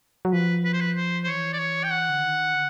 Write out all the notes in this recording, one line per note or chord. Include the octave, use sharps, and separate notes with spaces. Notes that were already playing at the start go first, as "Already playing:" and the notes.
F#3
F3 B4
B4
C5
B4
C5
C5
E3 C#5
D5
C#5
G5
F#5
D3
D#3
D3